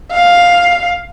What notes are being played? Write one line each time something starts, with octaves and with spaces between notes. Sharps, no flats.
F5